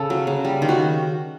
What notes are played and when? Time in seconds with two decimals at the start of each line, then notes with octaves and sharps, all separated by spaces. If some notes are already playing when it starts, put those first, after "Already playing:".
Already playing: C#3 A4
0.10 F#3
0.27 C#3
0.45 G3
0.62 D#3
0.69 F#4